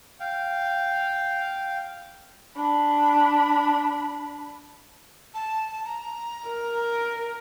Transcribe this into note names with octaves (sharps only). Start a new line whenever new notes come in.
F5 G5
D4 B5
A5
A#5
A#4